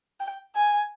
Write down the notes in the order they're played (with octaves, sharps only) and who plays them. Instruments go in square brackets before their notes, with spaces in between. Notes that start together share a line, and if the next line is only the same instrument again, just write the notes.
[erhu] G5
G#5